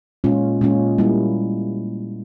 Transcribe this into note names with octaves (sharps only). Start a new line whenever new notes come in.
A#2 G#3 C#4 F4
A#2 G#3 C#4 F4
G3 A#3 E4